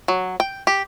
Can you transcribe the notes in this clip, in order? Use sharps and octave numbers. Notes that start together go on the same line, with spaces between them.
F#3
G5
G4